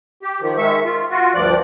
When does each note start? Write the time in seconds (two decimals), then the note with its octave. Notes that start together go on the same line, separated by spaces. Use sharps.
0.23 G4
0.42 D#3 F3
0.58 D#3 G#3 E5 C#6
0.85 F4
1.11 F4 F#4
1.35 D2 G2 F3 D5 F#6